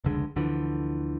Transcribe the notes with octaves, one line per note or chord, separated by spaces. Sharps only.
F1 C#2 D3 G#3
D2 D3 E3 F3